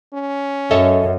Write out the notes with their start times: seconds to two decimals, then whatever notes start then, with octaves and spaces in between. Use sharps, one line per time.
0.14 C#4
0.71 F#2 A4 C#5 D#5 E5